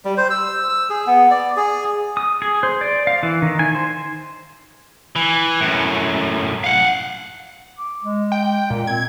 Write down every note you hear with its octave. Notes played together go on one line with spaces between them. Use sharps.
G3
C5
E6
E6
G#4
B3
D5
G#4
D#6
G#4
C5
D5
F5
E3
D#3
G#5
C5
E3
F#2 A2
F5 F#5
D6
G#3
G5
A#2
C4 G#6